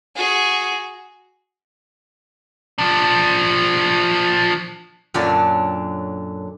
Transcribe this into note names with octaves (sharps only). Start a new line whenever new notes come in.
F#4 G#4
F3 D4
F#2 A#2 D3 F#3 D4 A5